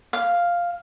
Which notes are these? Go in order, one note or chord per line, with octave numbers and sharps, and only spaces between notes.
F5